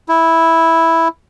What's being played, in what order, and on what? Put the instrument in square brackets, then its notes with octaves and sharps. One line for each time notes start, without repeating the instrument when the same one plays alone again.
[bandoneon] E4